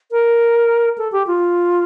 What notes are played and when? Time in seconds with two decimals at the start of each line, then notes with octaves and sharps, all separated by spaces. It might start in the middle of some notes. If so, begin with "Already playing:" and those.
0.11 A#4
0.98 A4
1.12 G4
1.27 F4